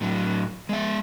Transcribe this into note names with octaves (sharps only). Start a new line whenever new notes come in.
A2 F#3
G#3 E5